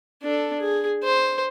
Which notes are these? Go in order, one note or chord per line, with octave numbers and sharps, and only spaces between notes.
D4 A4
G#4
C5